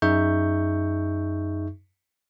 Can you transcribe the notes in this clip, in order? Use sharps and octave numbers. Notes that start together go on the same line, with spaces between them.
F#2 D#4 G#4 E5 C#6 G6